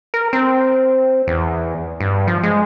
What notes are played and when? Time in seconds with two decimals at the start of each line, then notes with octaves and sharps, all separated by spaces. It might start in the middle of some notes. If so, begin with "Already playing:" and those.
0.14 A#4
0.33 C4
1.27 E2
2.00 G2
2.27 F3
2.43 G#3